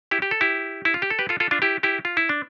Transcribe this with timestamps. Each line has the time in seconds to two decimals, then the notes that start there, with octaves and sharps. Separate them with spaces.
0.11 E4 G4
0.22 G4
0.31 A4
0.41 E4 G4
0.85 E4
0.94 F4
1.02 G4
1.10 A4
1.19 G4 B4
1.29 F4 A4
1.40 F4 A4
1.51 D4 F4
1.62 E4 G4
1.83 E4 G4
2.05 F4
2.17 E4
2.29 D4